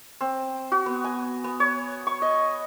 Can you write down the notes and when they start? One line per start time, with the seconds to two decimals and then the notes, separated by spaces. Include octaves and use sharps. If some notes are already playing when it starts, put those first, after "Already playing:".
0.21 C4
0.72 F#4
0.86 B3
1.04 G#5
1.44 B3
1.60 C#5
2.07 C#6
2.22 D#5